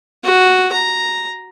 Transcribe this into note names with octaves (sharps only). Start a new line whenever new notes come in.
F#4
A#5